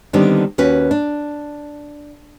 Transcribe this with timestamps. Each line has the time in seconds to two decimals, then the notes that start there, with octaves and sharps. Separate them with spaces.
0.13 D3 D#3 G3 B3 C4 D4
0.58 D#2 C#4 F#4 B4
0.91 D4